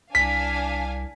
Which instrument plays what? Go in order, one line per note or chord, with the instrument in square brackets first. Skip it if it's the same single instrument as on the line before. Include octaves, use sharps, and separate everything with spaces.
[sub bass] C2 [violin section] D4 F5 G#5 [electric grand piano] B6